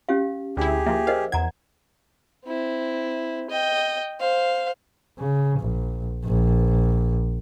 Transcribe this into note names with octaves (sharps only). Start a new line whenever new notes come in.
C#4 G4 F5
D2 E4 G4 G#4
F3 A#3 E5
A#4 C5 D#5 F5
E2 F#5 A#5 G#6
C4 E4
D#5 G5
C5 F5
C#3
A#1
A#1